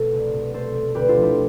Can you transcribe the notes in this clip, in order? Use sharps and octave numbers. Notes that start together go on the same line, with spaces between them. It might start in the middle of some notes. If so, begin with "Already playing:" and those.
Already playing: B2 A3 A4
C2
B2
A3 A4 C5
A3
D2 G4 B4
F4 A4
F3
E4 G4